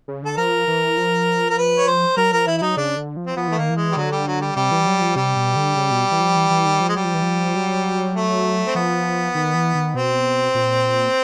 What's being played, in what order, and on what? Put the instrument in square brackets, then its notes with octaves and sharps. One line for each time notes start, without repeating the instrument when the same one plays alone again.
[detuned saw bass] C#3
[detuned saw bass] D3 [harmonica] A4
[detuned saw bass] F3 [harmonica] A#4
[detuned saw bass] E3
F3
[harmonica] A#4
B4
C#5
C5
[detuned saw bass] F#3 [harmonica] A#4
[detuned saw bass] F3 [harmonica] A#4
[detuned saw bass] E3 [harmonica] E4
[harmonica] E4
[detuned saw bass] F#3 [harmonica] D#4
[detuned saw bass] C#3 [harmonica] D4
[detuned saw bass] D3
F3
[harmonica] C4
[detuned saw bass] F3 [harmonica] B3
[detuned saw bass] E3 [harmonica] A3
[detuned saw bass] D#3 [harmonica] A#3
[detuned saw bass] E3
[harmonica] G#3
G3
[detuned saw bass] D3 [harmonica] F#3
[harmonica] G3
F#3
G3
[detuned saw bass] C3 [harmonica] G3
[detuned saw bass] E3
F#3
F3
[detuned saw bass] C3 [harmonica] G3
[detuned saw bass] B2
D3
C#3
B2
E3
F3
E3
E3
D#3
F3
[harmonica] G#3
[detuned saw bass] F#3 [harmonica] G3
[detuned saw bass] F3
E3
F3
F#3
[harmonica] A3
C4
[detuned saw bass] F3 [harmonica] B3
[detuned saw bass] D#3
E3
D#3
[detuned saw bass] B2 [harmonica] C4
[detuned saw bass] A#2